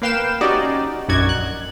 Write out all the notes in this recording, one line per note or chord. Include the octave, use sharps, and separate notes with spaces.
A#3 B4 F5 G5 E7
C#4 D#4 F#4 G4 D5 D#5
A#1 F#2 D#4 F#4 D5 G#6
F#6